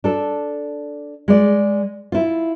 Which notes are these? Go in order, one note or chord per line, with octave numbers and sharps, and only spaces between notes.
D4 A4
G#3 D5
E4 F4